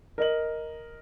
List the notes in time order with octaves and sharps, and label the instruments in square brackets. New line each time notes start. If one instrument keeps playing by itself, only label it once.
[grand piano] A#4 D#5 F#7